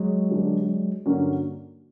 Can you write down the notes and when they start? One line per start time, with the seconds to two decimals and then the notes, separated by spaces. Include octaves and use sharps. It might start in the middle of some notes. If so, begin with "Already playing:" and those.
Already playing: F#3 G#3
0.30 D3 G3 A#3 D4
1.06 G2 D3 F#3 A#3 C#4